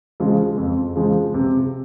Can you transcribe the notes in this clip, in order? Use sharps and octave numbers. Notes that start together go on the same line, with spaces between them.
C#3 F3 G#3
F2
C#3 F3 G#3
C3